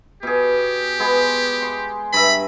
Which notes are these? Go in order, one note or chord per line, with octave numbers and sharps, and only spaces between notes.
B2 G4 G#4
G#3 B3 G#4
C6
G2 E5 B5